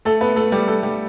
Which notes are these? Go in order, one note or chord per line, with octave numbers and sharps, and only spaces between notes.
A3 A4
B3 B4
A3 A4
G3 G4
A3 A4
G3 G4